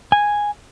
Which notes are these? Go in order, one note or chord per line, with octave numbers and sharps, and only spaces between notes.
G#5